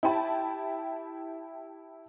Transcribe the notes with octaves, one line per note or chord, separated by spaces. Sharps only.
E4 G4 G5 A5 B5